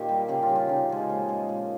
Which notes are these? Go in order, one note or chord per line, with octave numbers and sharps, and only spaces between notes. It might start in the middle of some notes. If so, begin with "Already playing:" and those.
Already playing: A#2 D#3 D#4 G4 A#4
G3
C#3 G4
F4
G3
F4
C#3 D#4
F3 G#3
A#2
G#3
A#2